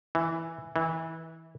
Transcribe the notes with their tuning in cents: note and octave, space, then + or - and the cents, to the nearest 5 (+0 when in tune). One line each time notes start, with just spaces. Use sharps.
E3 +0
E3 -20